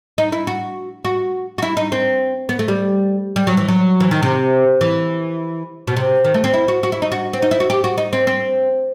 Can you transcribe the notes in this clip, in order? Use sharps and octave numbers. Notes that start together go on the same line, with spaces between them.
D#4
E4
F#4
F#4
F#4
E4
D#4
C4
B3
A3
G3
G3
F#3
E3
F#3
E3
D#3
C3
E3
B2
C3
D#3
A3
C4
E4
F#4
F#4
E4
D#4
F#4
C4
D#4
E4
F#4
G4
F#4
D#4
C4
C4